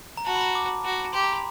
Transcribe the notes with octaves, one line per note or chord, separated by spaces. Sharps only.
A#5
F#4 A5
B5
A#5
D6
F#4
G4 C6
A#5
B5